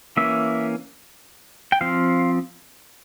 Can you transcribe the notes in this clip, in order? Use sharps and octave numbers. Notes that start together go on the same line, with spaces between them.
E3 A#3 C#4 E5
G5
F3 C4 F5